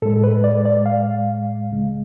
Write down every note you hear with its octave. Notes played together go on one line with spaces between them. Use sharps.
A2 G#3 A4
B4
D5
D5
F5
C#2 C#3 G#3